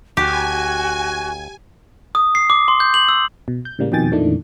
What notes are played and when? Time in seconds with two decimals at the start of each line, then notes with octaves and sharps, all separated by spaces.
0.17 D2 F#4 G4 G#5
2.15 D#6
2.35 C7
2.50 D6
2.68 C6
2.80 G6
2.94 F#7
3.09 E6
3.48 B2
3.65 G6
3.79 A2 C#3 G3 A#3
3.92 F2 B2 D#3 G5 G#5 A6
4.11 F2 A#2 D#3 E3 A3 D4